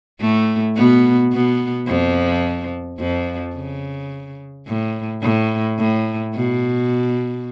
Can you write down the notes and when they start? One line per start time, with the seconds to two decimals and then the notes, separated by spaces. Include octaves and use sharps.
0.21 A2 A3
0.77 B2 B3
1.32 B2 B3
1.88 F2 F3
3.00 F2 F3
3.55 C#3
4.67 A2
5.23 A2
5.79 A2
6.34 B2